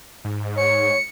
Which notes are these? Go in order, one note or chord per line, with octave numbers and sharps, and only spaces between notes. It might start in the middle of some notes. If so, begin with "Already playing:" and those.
G#2
C#5 C#7